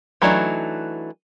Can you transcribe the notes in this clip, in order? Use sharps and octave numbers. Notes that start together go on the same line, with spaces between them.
E3 F#3 A3 D4 D#4